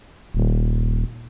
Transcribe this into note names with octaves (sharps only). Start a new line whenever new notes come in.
D#1